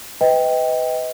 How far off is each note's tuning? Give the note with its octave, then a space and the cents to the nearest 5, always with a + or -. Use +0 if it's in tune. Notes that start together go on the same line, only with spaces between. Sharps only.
B4 +25 D#5 +30 G5 +5